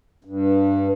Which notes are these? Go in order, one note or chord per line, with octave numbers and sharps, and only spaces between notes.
G2